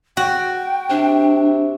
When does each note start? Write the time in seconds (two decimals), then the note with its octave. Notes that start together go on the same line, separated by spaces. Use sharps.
0.17 F#4 G5
0.90 C3 D4